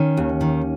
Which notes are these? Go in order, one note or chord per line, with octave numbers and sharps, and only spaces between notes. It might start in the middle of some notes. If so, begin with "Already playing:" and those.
Already playing: D#3 C#4
D#2
D#3